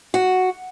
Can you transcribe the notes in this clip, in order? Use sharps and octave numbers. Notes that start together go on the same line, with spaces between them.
F#4